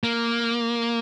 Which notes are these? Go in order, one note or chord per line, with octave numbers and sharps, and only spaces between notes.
A#3